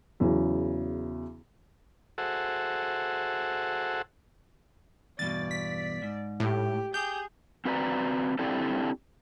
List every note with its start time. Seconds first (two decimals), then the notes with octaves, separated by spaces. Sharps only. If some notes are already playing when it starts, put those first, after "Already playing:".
0.20 E2 C#3 F#3 C#4
2.18 F#4 G#4 A4 C5 E5 F#5
5.19 E2 G2 B2 D5 A6
5.51 B6
6.02 G#2
6.40 A2 G4
6.94 G4 G#4 G6
7.65 C4 F#4 B4 D5 G#5 A#5
8.39 C4 D4 E4 G4 A4 D5